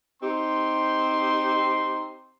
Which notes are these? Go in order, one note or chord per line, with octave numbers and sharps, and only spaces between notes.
C4 D#4 G4 C6